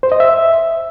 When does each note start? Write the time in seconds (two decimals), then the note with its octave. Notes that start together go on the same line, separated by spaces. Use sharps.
0.03 C5
0.12 D#5
0.20 E5